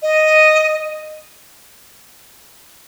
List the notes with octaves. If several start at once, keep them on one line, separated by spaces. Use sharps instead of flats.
D#5